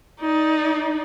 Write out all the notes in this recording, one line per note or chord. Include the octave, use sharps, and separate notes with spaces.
D#4 D5